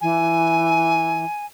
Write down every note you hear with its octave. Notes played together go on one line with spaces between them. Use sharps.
E3 G#5